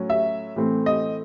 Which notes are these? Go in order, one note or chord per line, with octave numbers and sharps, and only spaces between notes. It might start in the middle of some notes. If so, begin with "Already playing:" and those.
Already playing: A2 F#3 C#4
E5
A2 E3 A3 C4
D#5